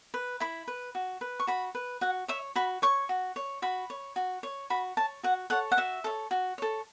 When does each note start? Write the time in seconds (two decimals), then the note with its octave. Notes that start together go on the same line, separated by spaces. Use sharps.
0.14 B4
0.40 E4 B5
0.68 B4
0.95 F#4
1.21 B4
1.40 C#6
1.47 F#4 B5
1.75 B4
2.01 F#4 F#5
2.28 C#5 E5
2.55 F#4 B5
2.82 C#5 C#6
3.09 F#4
3.36 C#5
3.62 F#4 B5
3.90 C#5
4.16 F#4
4.43 C#5
4.70 F#4 B5
4.97 C#5 A5
5.23 F#4 F#5
5.50 A4 C#5 F#5
5.72 F#5
5.77 F#4 E5
6.04 A4 C#5
6.31 F#4
6.58 A4 C#5